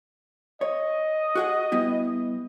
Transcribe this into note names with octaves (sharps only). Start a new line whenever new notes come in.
C#5 D#5
F#4 G#4 F#5
G3 B3 E4